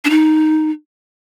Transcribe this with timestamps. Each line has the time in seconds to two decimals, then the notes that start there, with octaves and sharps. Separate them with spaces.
0.05 D4
0.10 D#4